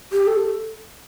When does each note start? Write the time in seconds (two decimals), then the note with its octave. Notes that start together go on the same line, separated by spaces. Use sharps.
0.13 G4
0.27 A4